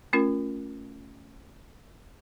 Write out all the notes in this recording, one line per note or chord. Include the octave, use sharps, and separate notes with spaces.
A3 C#4 F4 A#4